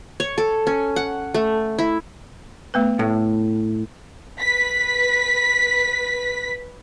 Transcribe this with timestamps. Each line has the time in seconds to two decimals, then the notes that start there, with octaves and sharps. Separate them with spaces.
0.20 C#5
0.38 A4
0.67 C#4
0.96 F#5
1.34 A3
1.79 E4
2.74 A3 B3 B4
2.99 A2
4.40 B4 B6